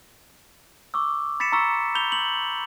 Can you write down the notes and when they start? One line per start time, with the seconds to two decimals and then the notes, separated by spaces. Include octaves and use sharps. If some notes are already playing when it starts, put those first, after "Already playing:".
0.94 C#6 D6 E6
1.40 B5 A6 B6 C#7 E7
1.52 A#5 C6 C#6 E6 C#7
1.95 B5 G6 F7 G7
2.12 C6 F#7